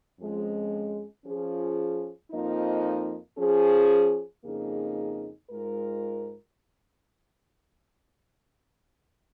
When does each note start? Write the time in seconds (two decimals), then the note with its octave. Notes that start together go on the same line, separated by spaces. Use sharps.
0.20 F2 F3 G#3 C#4
1.26 F3 C#4 F4 G#4
2.31 F2 F3 A#3 D#4
3.38 F3 C#4 G#4
4.44 F2 C#3 A#3 D#4 G#4
5.50 G#2 G#3 F4 A#4